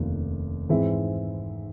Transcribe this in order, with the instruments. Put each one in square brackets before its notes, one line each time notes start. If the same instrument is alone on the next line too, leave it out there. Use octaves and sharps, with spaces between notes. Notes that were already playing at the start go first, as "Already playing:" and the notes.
Already playing: [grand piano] F1 D#2 C#3 F3
G#2 E3 G#3 C4 E4